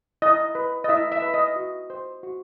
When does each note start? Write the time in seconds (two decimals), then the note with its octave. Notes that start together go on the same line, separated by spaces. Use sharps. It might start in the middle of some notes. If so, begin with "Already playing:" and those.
0.22 E4 D#5
0.55 B4
0.84 D#5
0.89 E4 E5
1.12 E5
1.22 B4
1.34 D#5
1.56 F#4
1.90 C5
2.23 F#4